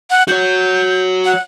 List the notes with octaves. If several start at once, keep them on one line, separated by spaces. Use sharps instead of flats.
F#5
F#4 C#5 G6
F#5